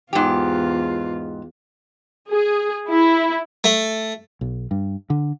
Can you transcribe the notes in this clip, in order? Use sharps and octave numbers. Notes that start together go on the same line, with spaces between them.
E2 G#2 F4 G4
G#4
E4
A3
B1
G2
D3